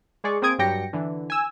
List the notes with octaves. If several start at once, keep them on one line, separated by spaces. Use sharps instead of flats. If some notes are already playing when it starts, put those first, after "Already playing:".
G#3 G#4 D5 C#6
A#3 C4 G#4 D#6 G#6 D7
G2 F#3 G4 G5 A#6 C#7
D3 E3
G#5 E6